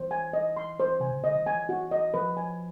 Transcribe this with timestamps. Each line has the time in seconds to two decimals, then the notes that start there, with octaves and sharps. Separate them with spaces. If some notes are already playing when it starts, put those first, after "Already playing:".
Already playing: E3 C5
0.11 G#5
0.33 D#5
0.57 C6
0.80 C5
1.00 C3 G#5
1.12 C#3
1.23 D3 D#5
1.35 D#3
1.46 E3 G#5
1.69 F#4
1.91 D#5
2.14 F3 B4
2.37 G#5